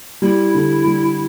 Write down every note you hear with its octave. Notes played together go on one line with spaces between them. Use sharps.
G3 E4
D3
G3